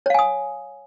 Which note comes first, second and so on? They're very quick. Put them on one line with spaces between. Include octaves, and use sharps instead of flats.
C#5 F5 G#5 D#6